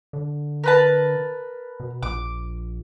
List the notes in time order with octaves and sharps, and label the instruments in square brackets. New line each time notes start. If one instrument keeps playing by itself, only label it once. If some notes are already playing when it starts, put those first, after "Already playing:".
[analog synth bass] D3
[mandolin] A#4 B4 A5
[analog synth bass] B2
[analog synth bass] A#1 [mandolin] D6